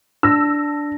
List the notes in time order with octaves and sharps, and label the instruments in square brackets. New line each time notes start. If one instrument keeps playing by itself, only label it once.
[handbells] D4 A#6 [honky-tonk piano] E6